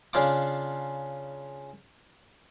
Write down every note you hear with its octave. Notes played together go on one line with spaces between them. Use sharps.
C#3 D4 F4 D6